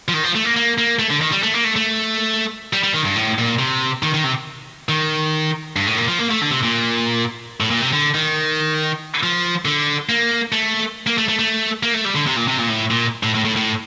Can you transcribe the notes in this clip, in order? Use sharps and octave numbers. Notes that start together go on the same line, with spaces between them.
F3
D#3
F3
A3
A#3
A#3
A#3
A3
D3
D#3
G3
A3
A#3
A3
A3
G3
G3
D#3
G2
A2
A#2
C3
D#3
D#3
C3
D#3
G2
A2
A#2
F3
A#3
A3
D3
C3
A#2
A2
A#2
C3
D3
D#3
F3
D3
A#3
A3
A#3
A3
A3
A3
A#3
A3
G3
D3
C3
A#2
C3
A#2
A2
A#2
A2
A2
A2
A2